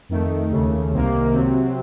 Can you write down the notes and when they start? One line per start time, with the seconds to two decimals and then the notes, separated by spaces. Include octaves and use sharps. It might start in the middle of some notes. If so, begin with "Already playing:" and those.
0.09 F2 D#3 A3
0.50 D#2 C#3 A3
0.92 C2 C3 D#3 A#3
1.33 C3 F#3 C4